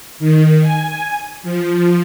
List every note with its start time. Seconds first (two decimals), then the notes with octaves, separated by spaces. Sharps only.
0.19 D#3
0.62 G#5
1.43 F3